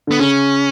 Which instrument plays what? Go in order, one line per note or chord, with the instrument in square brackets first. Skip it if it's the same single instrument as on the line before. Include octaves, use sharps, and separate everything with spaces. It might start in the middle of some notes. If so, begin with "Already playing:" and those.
[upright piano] D3 [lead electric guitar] B3
[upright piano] C#3 [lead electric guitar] C#4